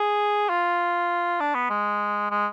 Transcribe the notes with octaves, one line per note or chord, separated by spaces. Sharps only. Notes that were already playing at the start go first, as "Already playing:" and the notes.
Already playing: G#4
F4
D4
B3
G#3
G#3